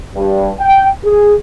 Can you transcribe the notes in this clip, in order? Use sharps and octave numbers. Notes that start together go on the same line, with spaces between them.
G2
G5
G#4